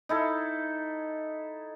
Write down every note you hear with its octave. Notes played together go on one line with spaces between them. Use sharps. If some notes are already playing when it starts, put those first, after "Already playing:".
D#4 E4 A4